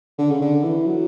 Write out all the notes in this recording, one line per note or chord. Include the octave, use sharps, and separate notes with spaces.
D3
C#3
D3
E3
F#3